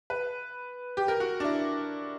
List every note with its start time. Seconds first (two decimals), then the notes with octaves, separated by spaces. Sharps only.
0.10 B4
0.97 G4
1.08 A#4
1.20 F#4
1.40 D4
1.44 E4